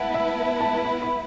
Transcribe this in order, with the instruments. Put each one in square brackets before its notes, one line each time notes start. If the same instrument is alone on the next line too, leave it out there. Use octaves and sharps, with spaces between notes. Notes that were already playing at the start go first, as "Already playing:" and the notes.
Already playing: [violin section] B3 E4 B4 [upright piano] F#5 A5
[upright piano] E5
A5
A5
B5
B5